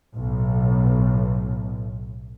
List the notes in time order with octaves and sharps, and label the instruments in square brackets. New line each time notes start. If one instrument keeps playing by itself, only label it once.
[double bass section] B1 A2